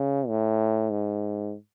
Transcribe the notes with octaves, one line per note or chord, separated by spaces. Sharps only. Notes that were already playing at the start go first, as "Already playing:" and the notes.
Already playing: C#3
A2
G#2